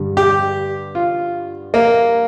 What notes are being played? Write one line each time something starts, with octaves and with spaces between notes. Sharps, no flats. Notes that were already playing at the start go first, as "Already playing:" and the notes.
Already playing: G2 D3 G3
G4
F4
A#3